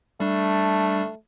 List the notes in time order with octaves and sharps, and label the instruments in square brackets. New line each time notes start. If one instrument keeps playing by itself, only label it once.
[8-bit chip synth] G3 D4 [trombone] A3